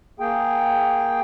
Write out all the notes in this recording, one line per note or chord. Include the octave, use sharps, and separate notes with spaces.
A#3 G#4 G5